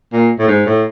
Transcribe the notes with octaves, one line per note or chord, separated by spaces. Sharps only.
A#2
A2
G#2
A2